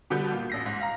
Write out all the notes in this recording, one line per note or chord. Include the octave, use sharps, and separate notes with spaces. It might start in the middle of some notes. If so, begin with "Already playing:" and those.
B2 D3 G3 B3 G6
A#2 F4
A1 A#6 C7
G#2
F5 A#5